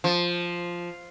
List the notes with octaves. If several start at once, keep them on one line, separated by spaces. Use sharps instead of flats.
F3